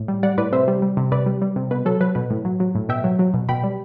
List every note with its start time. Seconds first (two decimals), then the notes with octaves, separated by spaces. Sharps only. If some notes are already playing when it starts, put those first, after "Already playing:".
Already playing: A2
0.08 G3
0.23 G3 D5 F#5
0.38 A2 B4 D5
0.53 C3 C5 E5
0.68 G3
0.82 G3
0.97 C3
1.12 C3 B4 D5
1.26 G3
1.42 G3
1.56 C3
1.71 B2 B4
1.85 F#3 A4
2.01 F#3 B4
2.15 B2 B4
2.30 A2
2.45 F#3
2.60 F#3
2.75 A2
2.89 B2 E5 G5
3.04 F#3
3.19 F#3
3.34 B2
3.49 B2 G5 B5
3.64 G3